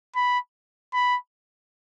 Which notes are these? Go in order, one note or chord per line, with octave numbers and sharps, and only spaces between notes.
B5
B5